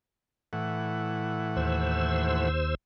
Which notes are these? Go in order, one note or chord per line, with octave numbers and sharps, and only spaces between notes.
A2 E3 F#5
D#2 C5 E6